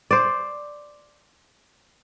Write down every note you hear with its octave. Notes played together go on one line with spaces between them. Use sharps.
C5 D5